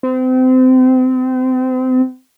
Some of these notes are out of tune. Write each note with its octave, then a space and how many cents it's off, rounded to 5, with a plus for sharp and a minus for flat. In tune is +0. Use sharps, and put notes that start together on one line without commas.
C4 -30